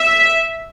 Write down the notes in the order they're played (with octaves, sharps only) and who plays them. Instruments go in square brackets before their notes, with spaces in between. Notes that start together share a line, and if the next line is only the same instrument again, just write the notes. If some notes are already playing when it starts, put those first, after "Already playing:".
Already playing: [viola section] E5